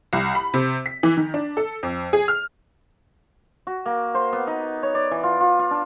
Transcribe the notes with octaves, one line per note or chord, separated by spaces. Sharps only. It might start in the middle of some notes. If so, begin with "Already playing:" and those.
C2
B5
C3
B6
E3
D#3
D4
A4
F2
G#4
F6
F#4
A#3
C5
B3
D#4
C#5
D5
E3
F4
F4
F4
D4